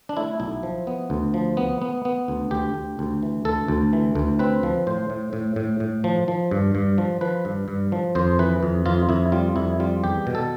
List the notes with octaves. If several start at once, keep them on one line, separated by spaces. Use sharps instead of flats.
D4
A3 E4
B1 E4
F3
B3
D2
F3
B3
B3
B3
D2
D2 G4
D2
D2
E3
D2 A4
D2
E3
D2
C4 B4
F3
A2 C5
A2
A2
A2
A2
F3
F3
G2
G2
F3
F3 B4
G2
G2
F3
F2 C5
E3 B4
F2
F2 F4
F2 E4
G3 F4
F2 E4
G3 F4
E2 G4
B2
A4